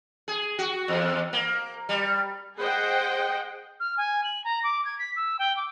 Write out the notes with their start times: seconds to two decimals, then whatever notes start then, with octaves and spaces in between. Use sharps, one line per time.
0.28 G#4
0.59 F#4
0.88 E2
1.33 A#3
1.89 G3
2.58 G#4 C5 D#5 F#5 G5
3.80 F6
3.97 G#5
4.24 F#7
4.44 A#5
4.63 D6
4.85 G#6
4.99 B6
5.16 E6
5.39 G5
5.57 D6